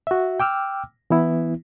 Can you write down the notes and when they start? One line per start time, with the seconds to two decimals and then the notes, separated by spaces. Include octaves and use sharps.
0.07 F#4 E5
0.40 G5 D6 E6 F6
1.10 E3 B3 E4